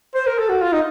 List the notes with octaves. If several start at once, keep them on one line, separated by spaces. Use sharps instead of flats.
C5
A#4
A4
F#4
F4
D#4